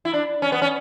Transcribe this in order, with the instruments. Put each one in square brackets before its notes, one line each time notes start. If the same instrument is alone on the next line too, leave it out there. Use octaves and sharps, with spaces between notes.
[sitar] E4
D4
C#4
B3
C#4